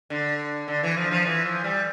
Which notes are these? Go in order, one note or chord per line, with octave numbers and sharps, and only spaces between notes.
D3
D3
E3
F3
F3
E3
F3
G3